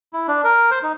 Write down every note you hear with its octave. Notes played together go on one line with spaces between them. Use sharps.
E4
D4
A#4
C5
D#4